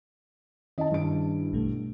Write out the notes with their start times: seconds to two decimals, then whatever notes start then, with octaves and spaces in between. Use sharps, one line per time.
0.78 D#3 C#4 E4 D#5 A5
0.91 G2 D7
1.52 A#1 B2 A3